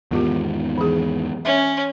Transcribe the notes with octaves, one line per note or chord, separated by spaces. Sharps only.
E2 G#2 D#3 B3 F4 G4
E3 G#4
C#4 E5